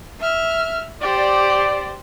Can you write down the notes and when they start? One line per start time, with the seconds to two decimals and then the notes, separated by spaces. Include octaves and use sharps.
0.20 E5 F6
1.01 G4 C5 D5